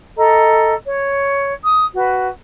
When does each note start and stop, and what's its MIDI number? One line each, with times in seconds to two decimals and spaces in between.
0.17 0.74 69
0.17 0.74 75
0.17 0.74 82
0.84 1.51 73
1.64 1.84 87
1.94 2.27 66
1.94 2.27 71